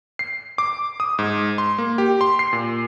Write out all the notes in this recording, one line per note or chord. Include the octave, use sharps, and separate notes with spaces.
C7
D6
D#6
G#2
C6
A#3
G4
C6
C7
A#2